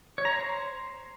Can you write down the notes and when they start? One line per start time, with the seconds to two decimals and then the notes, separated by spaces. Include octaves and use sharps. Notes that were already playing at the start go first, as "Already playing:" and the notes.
0.18 C#5
0.25 A#5
0.32 C5